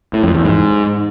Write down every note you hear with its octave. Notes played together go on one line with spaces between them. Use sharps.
A2
F2
E2
G#2